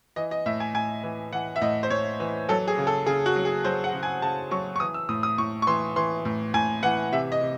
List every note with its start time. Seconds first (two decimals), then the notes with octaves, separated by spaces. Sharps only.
0.16 E3 D#5
0.31 D#5
0.46 A2 E5
0.60 G#5
0.74 A2 G#5
1.03 E3
1.33 E3 F#5
1.56 E5
1.61 A2 D#5
1.83 C5
1.90 A2 C#5
2.20 E3
2.49 F#3 A4
2.67 G#4
2.78 C#3
2.87 A4
3.06 C#3 G#4
3.26 F#4
3.36 F#3
3.45 G#4
3.64 F#3 C5
3.84 F#5
3.93 C#3
4.03 G#5
4.22 C#3 A5
4.51 F#3 C#6
4.76 C#6
4.80 E3 D#6
4.94 E6
5.09 A2 D#6
5.23 D#6
5.38 A2 C#6
5.62 C#6
5.67 E3 C6
5.96 E3 C6
6.25 A2
6.54 A2 G#5
6.83 E3 F#5
7.12 C3 E5
7.32 D#5
7.41 C3